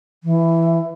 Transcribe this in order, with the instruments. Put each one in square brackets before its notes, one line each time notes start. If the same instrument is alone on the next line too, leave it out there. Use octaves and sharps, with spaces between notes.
[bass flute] E3